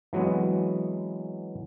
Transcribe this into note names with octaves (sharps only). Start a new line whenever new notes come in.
E3 F#3 G#3 B3 C4